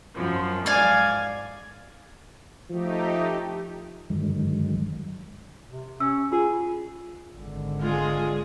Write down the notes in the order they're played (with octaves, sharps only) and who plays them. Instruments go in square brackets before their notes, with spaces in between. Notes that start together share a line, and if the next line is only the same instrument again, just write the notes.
[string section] F#2 F3
[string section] G#2 G#6 [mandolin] D5 F5 G#5
[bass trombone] F3 [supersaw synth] A3 D#4 G4
[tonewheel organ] G2 D3 D#3 F#3 G#3
[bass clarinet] C3
[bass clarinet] C#4 [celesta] E6
[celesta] F4 [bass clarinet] G#4
[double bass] G#1 D3
[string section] G#3 G#4 [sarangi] F4